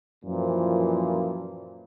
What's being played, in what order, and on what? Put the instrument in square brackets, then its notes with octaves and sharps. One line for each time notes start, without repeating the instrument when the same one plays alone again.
[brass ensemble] F#2 A#2 E3 F3